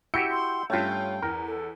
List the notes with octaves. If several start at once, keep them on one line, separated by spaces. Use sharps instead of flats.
E4 F#4 G4 E6 G6 C#7
C6
G2 A3 C#4 F4 G5
E2 A#4
A4